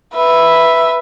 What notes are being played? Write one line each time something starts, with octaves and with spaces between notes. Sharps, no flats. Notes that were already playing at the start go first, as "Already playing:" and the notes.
B4 E5